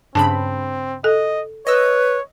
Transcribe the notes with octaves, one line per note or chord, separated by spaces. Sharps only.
G2 C#3 C4 A5 B5
A4 D#5
B4 C#5 D#5 E6